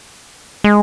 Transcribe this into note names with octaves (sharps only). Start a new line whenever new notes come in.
G#3